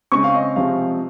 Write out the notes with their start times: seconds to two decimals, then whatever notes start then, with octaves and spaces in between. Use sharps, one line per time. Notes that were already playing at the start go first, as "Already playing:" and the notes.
0.12 C#3 G#3 C4 C#6
0.24 F5
0.34 D#5
0.56 C3 F3 G#3 C4 F5